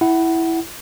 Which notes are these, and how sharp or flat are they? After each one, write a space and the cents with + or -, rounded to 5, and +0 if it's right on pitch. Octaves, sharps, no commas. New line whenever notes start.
E4 +0 F#5 +20